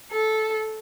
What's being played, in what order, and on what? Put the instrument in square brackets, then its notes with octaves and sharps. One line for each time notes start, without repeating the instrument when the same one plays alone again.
[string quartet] A4